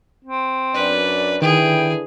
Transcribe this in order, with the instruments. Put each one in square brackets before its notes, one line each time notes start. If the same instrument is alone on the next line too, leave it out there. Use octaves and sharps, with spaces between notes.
[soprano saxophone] C4
[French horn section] F#2 D4 D5 [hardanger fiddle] B4
[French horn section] D3 E4 B4 [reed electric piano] D#3 [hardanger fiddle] G#4 [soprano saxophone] G5